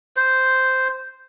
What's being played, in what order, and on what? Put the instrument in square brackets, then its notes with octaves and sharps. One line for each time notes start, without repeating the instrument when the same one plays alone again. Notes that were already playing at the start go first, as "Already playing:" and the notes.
[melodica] C5